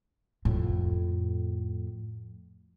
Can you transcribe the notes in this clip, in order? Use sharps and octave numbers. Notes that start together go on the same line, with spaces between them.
F2 A2